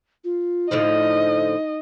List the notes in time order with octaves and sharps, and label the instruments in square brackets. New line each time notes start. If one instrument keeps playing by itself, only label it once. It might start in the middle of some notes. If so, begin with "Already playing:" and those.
[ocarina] F4
[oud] A2 D3 F3 [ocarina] D#4 [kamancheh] D#5